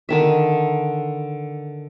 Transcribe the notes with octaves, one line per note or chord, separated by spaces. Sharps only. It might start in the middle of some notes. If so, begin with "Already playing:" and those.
D3 D#3 E5